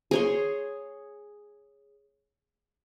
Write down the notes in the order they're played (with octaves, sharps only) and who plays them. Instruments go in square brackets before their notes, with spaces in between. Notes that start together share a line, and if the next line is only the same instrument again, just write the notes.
[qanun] G#4 C#5 C6